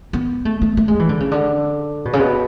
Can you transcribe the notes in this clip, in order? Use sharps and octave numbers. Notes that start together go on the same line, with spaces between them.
B3
A3
A3
A3
G#3
E3
D3
C#3
D3
B2
C#3
B2